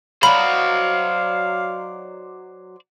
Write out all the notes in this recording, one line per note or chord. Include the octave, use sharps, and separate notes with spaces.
F#3 D#4 C5 D5 F5 B5